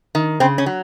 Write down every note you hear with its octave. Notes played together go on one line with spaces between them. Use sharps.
D#3
C#3 C4
C#4
F#3